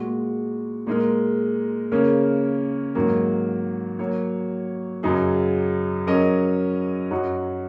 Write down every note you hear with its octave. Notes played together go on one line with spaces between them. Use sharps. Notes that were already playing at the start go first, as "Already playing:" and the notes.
Already playing: A#2 G#3 F#4
A#2 G#3 D#4 A#4
C#3 A#3 C#4 A#4
G#2 D#3 F#3 A#3
F#3 A#3 F#4 C#5
F#2 C#3 F#3 D#4 G#4
F#3 C#4 A#4 D#5
F#2 F#3 D#4 F#4